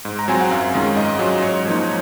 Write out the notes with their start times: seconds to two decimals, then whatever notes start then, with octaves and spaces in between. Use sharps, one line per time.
0.05 G#2
0.19 A#5
0.28 F#3 C4 F4 G#5
0.41 F#5
0.51 F#2 F5
0.74 D#3 G#3 C#4 F4
0.96 G#2 D#5
1.19 F#3 C#4 F4
1.42 G#2 C#5
1.66 F3 A#3 D#4